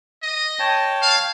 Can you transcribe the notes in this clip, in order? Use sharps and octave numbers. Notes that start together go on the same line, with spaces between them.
D#5
C#5 G5 A5
F5